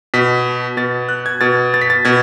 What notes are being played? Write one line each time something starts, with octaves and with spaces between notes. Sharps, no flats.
B2 B6
B2 A6
F#6
G#6
B2 A6
A6
B6
A6
B2 G#6